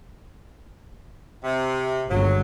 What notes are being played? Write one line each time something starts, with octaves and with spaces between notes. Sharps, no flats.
C3
G1 C#2 D3 F#3